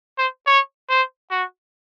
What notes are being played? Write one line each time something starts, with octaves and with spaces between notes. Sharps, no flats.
C5
C#5
C5
F#4